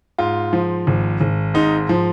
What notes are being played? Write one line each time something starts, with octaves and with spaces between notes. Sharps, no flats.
G#2 F4
F3
G#1
G#1
G#2 D#4
F3